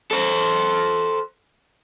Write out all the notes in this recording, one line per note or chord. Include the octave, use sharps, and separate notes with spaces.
A4 C5